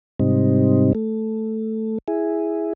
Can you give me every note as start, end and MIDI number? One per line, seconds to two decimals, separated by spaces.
0.19 0.93 44
0.19 0.93 48
0.19 0.93 55
0.19 0.93 60
0.19 0.93 63
0.95 1.98 57
2.08 2.73 64
2.08 2.73 68